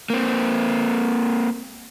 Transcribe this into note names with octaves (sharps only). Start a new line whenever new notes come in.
A#3 C4